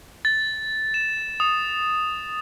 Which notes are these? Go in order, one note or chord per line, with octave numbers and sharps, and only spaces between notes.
A6
E7
D#6